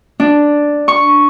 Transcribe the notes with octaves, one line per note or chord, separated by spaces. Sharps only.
D4
C#6